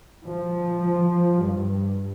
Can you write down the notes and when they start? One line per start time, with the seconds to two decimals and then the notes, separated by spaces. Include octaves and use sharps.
0.24 F3
1.41 G2